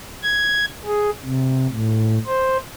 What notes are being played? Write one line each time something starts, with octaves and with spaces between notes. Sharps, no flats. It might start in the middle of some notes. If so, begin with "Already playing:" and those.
G#6
G#4
C3
A2
C5